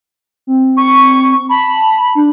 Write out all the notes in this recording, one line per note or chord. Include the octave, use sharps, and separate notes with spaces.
C4
C#6
A5 B5
D4